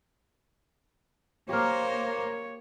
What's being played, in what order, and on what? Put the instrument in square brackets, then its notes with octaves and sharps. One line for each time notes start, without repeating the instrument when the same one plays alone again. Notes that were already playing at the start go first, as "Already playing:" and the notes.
[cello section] A#3 [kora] G4 A#4 [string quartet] C5 [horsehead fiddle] C#5